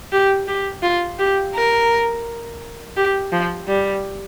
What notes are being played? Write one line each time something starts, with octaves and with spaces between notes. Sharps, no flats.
G4
G4
F4
G4
A#4
G4
F3
G3